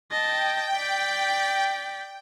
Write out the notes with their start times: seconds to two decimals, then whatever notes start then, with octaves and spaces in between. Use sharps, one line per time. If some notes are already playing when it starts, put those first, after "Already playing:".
0.11 D#5 G5 A5
0.74 D5 B6